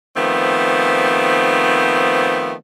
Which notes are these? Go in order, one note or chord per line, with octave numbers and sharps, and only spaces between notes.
D#3 F3 A3 B3 C4